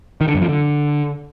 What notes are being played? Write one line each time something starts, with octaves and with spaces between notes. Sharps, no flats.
D#3
D3
F#2
F3
D3